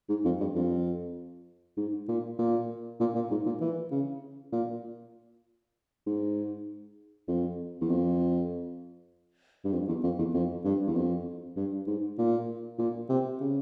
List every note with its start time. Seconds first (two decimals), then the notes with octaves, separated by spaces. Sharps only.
0.09 G#2
0.25 F2
0.40 G2
0.55 F2
1.77 G#2
2.08 A#2
2.39 A#2
3.00 A#2
3.15 A#2
3.31 G#2
3.46 A#2
3.61 E3
3.91 C#3
4.53 A#2
6.06 G#2
7.28 F2
7.81 E2
7.89 F2
9.64 G2
9.73 F2
9.88 E2
10.04 F2
10.19 E2
10.34 F2
10.65 G2
10.87 E2
10.95 F2
11.56 G2
11.87 G#2
12.18 A#2
12.79 A#2
13.09 C3
13.40 C#3